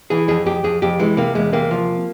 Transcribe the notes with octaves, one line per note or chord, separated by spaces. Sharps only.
E3 G#4
F2 G#4
F2 G4
F2 G#4
F2 G4
E3 G#3
C3 A#3
E2 G#3
C3 A#3
F3